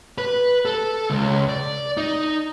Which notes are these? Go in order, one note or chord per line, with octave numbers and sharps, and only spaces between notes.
B4
A4
C#2
D5
D#4